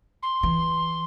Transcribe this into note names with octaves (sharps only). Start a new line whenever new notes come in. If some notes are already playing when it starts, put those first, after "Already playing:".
C6
E3